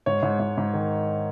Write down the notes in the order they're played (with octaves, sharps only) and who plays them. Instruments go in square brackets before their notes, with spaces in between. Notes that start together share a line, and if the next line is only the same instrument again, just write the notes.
[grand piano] G#2 C#5
G#2
G#2
G#2
D#3